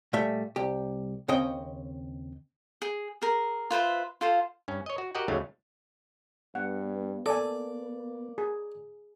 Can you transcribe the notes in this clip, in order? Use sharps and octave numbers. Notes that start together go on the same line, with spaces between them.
A#2 G3 A3 E5
C2 G4
D#2 C#3 C4 C#4 D#5 G5
G#4
G#4 A#4
F4 B4 C5 E5
F4 A4 C5 F5
G2 C#4
C#5 D#5
F#4
F#4 G4 A#4 D#5 F#5 G5
D#2 G#2 C#3 F#3 A3 F5
G2 B3 F#5
A#3 A4 D5 G#5
G#4